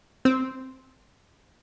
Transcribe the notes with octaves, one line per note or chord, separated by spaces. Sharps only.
C4